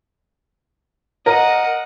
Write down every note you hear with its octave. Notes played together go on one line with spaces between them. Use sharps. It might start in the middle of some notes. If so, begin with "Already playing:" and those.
A#4 D#5 F#5